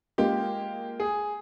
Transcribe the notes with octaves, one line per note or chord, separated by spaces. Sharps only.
G#3 A#3 F4 G4
G#4